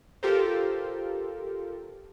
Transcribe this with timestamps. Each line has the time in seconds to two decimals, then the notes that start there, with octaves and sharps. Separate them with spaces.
0.23 F4 G4 A4 A#4 C5